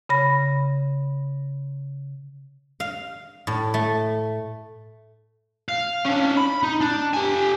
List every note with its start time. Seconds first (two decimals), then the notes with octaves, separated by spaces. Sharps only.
0.09 C#3 B5 A#6
2.80 F5
3.47 A2
3.74 A3
5.69 F5
6.05 C#4 D4
6.37 B5
6.63 D#4
6.81 D4
7.14 G4 G#5